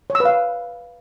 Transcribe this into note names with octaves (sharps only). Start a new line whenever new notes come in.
C#5
E6
B4
F5